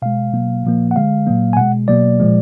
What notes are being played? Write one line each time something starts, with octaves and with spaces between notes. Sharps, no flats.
B2 G#3 F5
B2 F#3 A#3
A#2 F3 A#3
F#5
D3 G#3 F5
A#2 F#3 A#3
G#5
B2 G#3 F#5
B2 F#3 A#3 D5
A#2 F3 G#3